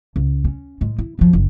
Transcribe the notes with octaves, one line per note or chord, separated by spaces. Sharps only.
C#2
C#4
A2 G#3
E4
F#2 F3
F#1